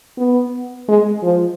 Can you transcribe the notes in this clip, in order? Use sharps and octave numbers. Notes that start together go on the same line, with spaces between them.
B3
G#3
F3